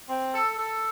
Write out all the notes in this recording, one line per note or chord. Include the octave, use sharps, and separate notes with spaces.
C4
A4
A4